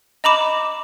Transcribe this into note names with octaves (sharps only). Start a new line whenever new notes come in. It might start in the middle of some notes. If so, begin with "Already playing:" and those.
D#5 A#5 B5 D6 E7